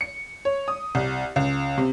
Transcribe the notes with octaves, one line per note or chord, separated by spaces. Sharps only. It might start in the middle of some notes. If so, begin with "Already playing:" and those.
C#7
C#5
D#6
C2
C#2
C3